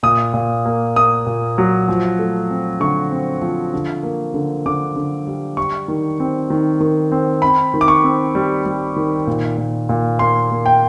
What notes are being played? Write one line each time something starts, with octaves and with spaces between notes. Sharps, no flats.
A#2 D#6
A#2
A#3
A#3 D#6
A#2
F#3
F3
A3
C4
D3 C#6
C4
F3
D3
A#3
D3
D3 D6
D3
G3
G3 C#6
D#3
C4
D#3
D#3
C4
C4 B5
D#3
D6
C#6
C4
G3
G3
D#3
A#2
A#2
A#2
A#3 C6
A#3
G5